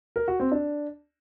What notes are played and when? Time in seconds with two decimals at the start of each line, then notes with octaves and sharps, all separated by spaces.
0.16 A#4
0.28 F#4
0.40 C4
0.52 D4